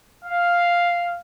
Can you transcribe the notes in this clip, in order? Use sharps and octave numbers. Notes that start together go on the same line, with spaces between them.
F5